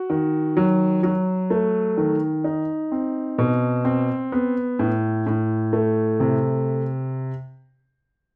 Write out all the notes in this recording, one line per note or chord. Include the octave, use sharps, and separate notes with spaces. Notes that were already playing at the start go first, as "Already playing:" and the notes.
Already playing: F#4
D#3
F#3
F#3
A3
D#3
D#4
C4
B2
C4
B3
A2
A2
A3
C3